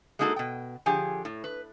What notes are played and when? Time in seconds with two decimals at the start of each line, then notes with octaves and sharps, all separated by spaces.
0.19 G#3 A#3 D#4 F#4 A4
0.36 B2 G5
0.86 D3 F3 G4 G#4 G#5
1.25 A2
1.44 B4